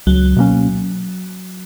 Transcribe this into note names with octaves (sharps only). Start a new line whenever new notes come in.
C#2 F#3
B2 A#3 C#4